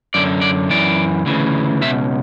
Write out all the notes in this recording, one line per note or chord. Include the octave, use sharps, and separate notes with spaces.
F#2 D3 D5
D5
F#2 E3 D5
D2 C#3 E3
C#2 B2 E5